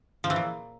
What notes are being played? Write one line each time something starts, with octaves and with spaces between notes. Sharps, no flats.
F3
E3
A#2